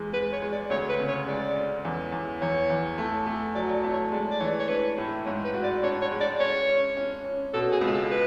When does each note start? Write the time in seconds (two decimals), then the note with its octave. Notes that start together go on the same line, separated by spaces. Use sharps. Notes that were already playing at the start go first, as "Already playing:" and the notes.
Already playing: E2 G#3
0.13 G#3 B4
0.33 C#5
0.42 G#3
0.52 D5
0.70 D2 C#5
0.89 B4
0.99 C#3
1.08 C#5
1.27 G#3 D5
1.56 C#4
1.85 E2
2.12 E2
2.41 E2 C#5
2.70 E2
2.98 A3
3.26 A3
3.55 F#3 D5
3.68 C#5
3.74 D5
3.83 A3
3.93 C#5
4.12 G#3 D5
4.30 D5
4.40 E3 C#5
4.59 C#5
4.68 D4 B4
4.98 A2
5.26 G#2 C#5
5.45 B4
5.54 F#4
5.63 D5
5.83 D4 C#5
6.02 C#5
6.11 G#3
6.21 D5
6.40 C#4 C#5
6.68 C#4
6.97 C#4
7.25 C#4
7.54 B2 A4
7.72 G#4
7.81 C#2
7.87 G#4
7.91 A4
8.11 B4